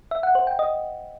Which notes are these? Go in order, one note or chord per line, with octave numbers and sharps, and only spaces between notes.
E5
F#5
C5
G5
D#5